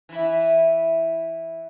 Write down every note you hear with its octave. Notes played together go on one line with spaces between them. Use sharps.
E3 E4